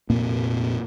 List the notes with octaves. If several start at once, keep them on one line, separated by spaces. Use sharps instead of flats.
F1 A#2 A#3 C4